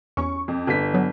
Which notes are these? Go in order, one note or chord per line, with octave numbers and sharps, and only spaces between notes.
E2 C#4 C#6
F2
G1 B6
F#3 B3